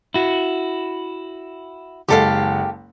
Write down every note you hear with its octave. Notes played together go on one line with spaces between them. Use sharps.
E4 F#4
F#1 G#3 G4 A4 F5 F#5